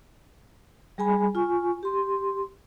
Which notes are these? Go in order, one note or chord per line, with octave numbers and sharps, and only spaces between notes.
G3 G#4 G#5 B5
F4 G#5 C#6
G4 C6